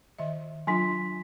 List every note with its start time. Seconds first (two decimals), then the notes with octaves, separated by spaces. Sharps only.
0.18 D#3 D#5 E5
0.67 F#3 D4 F4 G#5 C6 B6